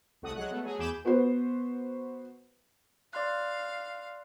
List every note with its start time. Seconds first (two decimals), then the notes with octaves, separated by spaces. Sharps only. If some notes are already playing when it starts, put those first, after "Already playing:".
0.22 C2 A3 F#4 F#5 D#6
0.35 F#3 G#3 F#5 F#6
0.51 A3 B3
0.64 F#3 A3 G#4
0.78 E2 G#4 B5 D6 G6 E7
1.05 B3 F#4 B4 C5
3.13 D5 F5 C6 F#6